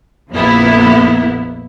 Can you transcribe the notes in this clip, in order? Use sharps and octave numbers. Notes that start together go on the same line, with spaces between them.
A#1 F2 A#3 B3 E4